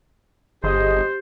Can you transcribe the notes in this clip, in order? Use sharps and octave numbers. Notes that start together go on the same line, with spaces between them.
G1 G4 G#4 C5 D#5